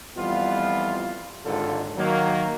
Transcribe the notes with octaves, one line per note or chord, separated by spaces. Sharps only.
F2 E3 G3 B3 F4
G#1 D#2 G#2 D3 F4 A4
D#3 F#3 A#3